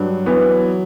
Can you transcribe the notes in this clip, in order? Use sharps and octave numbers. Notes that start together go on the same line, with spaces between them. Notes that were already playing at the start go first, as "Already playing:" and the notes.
Already playing: G2 F#3
E3 B3